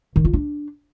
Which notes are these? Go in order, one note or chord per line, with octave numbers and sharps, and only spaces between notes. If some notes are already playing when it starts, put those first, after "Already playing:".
D#3
F4
D4